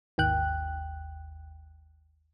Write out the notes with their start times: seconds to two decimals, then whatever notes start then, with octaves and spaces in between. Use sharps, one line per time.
0.18 G#1 D#2 G5 F#6